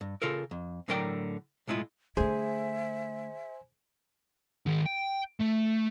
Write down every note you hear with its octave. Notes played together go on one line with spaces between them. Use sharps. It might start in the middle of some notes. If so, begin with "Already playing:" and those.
G2
C#3 F4 A4 A#4
F2
A2 D3 F#3 A#4 D5 G5
B1 A2 G#3 E4 F4
D3 A3 G#4 C5 E5 G#5
D#3 G#4
G5
A3